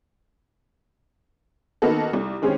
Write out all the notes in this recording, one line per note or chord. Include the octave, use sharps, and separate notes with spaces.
D#3 A#3 B3 D#4 F#4 A4
C2
D#3 G#3 C4 C#4 G4 C#5